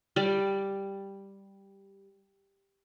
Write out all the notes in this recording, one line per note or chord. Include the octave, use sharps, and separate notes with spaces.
G3 D5